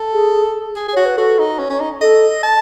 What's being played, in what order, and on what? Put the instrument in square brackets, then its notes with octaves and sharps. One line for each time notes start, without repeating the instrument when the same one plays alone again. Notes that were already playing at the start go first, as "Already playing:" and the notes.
Already playing: [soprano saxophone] A4
[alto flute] G#4
[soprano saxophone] G#4
G#4
[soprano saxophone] F#4 [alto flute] C#5
[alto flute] B4
[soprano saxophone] F#4 [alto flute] A4
[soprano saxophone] D#4
C#4
C#4
D#4
[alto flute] A4 [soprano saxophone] D#5
[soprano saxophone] A5